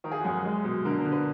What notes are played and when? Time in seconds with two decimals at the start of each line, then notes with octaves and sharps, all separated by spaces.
0.04 D#3 A#4
0.12 G#4
0.20 F#4
0.25 F#2 G#4
0.45 G#3
0.64 B2
0.85 D3 A#4
0.98 A#4
1.06 D3
1.12 B4